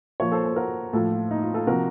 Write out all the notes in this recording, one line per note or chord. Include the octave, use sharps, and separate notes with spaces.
A#2 F3 A#4 C#5
A4 C5
A4 C5
F#4 A#4
A2 F3 F4 A4
F4
D#4
F4
F4 A4
C3 F3 F#4 A#4